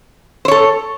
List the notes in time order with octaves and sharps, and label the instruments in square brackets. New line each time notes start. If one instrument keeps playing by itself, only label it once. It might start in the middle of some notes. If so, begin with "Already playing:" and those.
[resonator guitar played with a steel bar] C5
C#5
A4